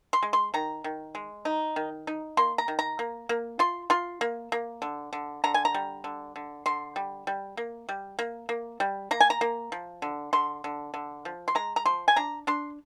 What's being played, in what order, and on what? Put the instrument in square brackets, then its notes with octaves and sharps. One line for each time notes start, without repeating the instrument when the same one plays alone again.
[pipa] C6
G#3
C6
D#3 A#5
D#3
G#3
D#4
D#3
D#4
A#3 C6
A#5
D#3
A#5
A#3
A#3
F4 C6
F4 C6
A#3
A#3
D3
D3
D3 A#5
G#5
A#5
G3
D3
D3
D3 C6
G3
G3
A#3
G3
A#3
A#3
G3
A#3 A#5
G#5
A#5
A#3
F3
D3
D3 C6
D3
D3
F3
C6
G#3 A#5
A#5
F3 C6
G#5
D4 A#5
D4 C6